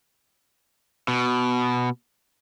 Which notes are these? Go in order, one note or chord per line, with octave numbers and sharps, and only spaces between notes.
B2